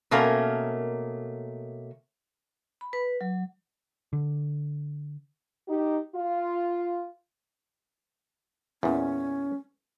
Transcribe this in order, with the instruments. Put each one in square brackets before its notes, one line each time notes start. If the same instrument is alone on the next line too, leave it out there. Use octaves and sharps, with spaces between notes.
[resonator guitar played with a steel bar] B2 A3 A#3 C#4 A#4
[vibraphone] B5
B4
F#3
[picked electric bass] D3
[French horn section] D#4 G4
F4
[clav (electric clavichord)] E2 A#2 [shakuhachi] C#4